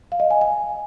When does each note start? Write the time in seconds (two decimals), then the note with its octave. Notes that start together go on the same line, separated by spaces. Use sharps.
0.12 F5
0.20 D#5
0.31 G#5
0.41 G#5